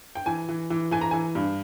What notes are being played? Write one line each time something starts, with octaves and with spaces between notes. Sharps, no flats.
G5
E3 G#5
E3
E3
E3 G#5
A#5
E3 G#5
G2